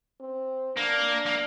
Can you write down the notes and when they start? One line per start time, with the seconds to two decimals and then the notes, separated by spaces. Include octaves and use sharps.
0.20 C4
0.77 A#3 D4
1.26 A#3